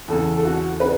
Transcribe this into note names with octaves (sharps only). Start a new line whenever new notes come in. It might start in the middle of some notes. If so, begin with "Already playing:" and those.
E2 C#3 E3 A4
A4
F#4
B4